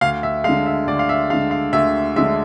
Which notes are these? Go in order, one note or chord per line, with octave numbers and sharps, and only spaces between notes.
D2 F5
E5
D3 G#3 F5
E5
D2 D5
F5
E5
D3 G#3 F5
F5
D2 E5
D3 G#3 E5